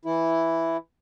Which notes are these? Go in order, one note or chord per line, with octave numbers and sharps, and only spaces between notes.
E3 E4